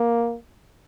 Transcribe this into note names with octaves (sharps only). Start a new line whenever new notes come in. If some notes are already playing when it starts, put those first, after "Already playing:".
Already playing: A#3